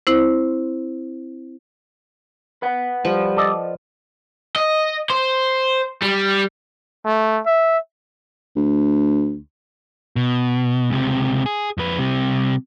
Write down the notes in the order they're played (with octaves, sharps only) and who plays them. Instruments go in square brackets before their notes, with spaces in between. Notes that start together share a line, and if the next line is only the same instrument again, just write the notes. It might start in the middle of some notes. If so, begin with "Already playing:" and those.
[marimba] C4 E4 C5
[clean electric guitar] B4 F#5
[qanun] F3 [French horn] G3
[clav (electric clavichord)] A4 D5 D#5
[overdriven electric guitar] D#5
C5
G3
[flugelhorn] A3
E5
[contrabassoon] D2
[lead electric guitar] B2
C#2 C3
G#4
F2 B4
C3 G3